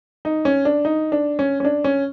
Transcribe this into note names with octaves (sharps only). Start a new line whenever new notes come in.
D#4
C#4
D4
D#4
D4
C#4
C#4
D4
C#4